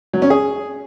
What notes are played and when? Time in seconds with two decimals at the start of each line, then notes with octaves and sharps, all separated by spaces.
0.13 F#3
0.22 C#4
0.30 G#4